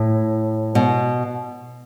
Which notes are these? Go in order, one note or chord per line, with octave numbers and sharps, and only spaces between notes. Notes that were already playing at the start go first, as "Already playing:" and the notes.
Already playing: A2
B2